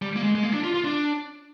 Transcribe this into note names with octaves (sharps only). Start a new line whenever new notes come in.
G3
A#3
G#3
G#3
A#3
D4
F4
F4
D4